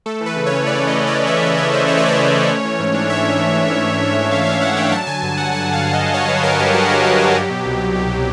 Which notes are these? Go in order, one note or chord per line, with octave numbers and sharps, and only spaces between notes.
A3 A4
E3
B4
C#3
C#4 C#5
A3 D5
E3
D#5
C#3
D5
C#4
A3 E5
E3 D5
C#3 C#5
C#4 C5
A3 C#5
D5
E3 C#5
C#3
C#4
A3
E3
G#2
D4
A3 E5
E3
G#2
D4
A3
E3
G#2
D4
A3 F5
E3 F5
G#2 F#5
D4 G5
F#3 A5
D3 G#5
G2
G2 F#5
F#3 F#5
D3
F5
G2
D#5
G2
F#3 C#5
D3 B4
G2 A#4
G2 G4
F#3 F#4
D3 F#4
G2 G4
G2 G4
F#3
B2
C2
C2
F#3
B2